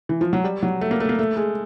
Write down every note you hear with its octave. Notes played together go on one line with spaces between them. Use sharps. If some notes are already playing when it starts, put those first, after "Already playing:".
E3
F3
F#3
G3
F#3
A3
A#3
A3
A#3
A3
G#3